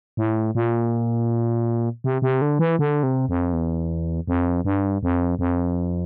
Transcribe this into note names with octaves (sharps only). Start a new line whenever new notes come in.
A2
A#2
C3
C3
D3
E3
D3
C3
F2
E2
F2
G2
F2
F2